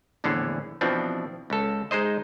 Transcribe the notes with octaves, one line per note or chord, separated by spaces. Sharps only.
A#1 E2 A2 D3
B2 E3 F3 C4 D4
C#2 A4
G#3 D#4 C5 D#5